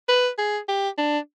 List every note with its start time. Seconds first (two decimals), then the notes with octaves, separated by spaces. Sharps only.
0.09 B4
0.38 G#4
0.68 G4
0.98 D4